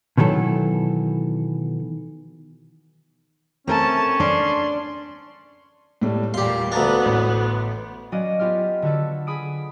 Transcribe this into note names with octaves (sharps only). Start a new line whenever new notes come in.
B2 D#3 E3 F#3 A4
A3 C4 C#4 A#4 A5
D4 D5 C6
A2 G3 A3
E2 A#2 G3 G4 F5 C6
D2 B3 D4 F5 A#5 A6
A1
F#3 C#4 F#4 D5 D#5 F5
B3 F4 G4 F6
D3 B3 F#4 A4
G#4 B5 D#6 D7